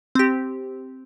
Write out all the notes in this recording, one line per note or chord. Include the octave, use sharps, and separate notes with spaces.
C4 G4